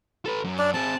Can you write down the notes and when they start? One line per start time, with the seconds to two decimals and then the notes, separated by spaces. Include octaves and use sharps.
0.26 A4 B4
0.44 F#2
0.59 D4 D5
0.74 C4 G#4 A5